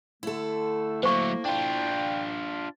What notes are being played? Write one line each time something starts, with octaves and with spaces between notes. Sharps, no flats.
D3 A3 E4 A4
F#3 A3 A#3 C5 C#6
D4 F4 G5